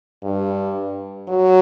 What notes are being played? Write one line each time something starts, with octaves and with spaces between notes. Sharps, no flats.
G2
F#3